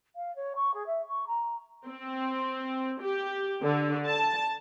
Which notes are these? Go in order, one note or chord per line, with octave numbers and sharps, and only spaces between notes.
F5
C#5
C#6
G#4
E5
C#6
A#5
C4
G4
D3
A5